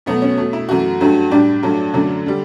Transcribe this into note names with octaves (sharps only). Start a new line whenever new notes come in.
B2 F#3 A3 B3
C#4
B2 A3
E4
F#2 E3 A3 F#4
G2 F#3 A3
A2 G3 D4
G2 F#3 A3
F#2 D3 F#3 A3
D3 G3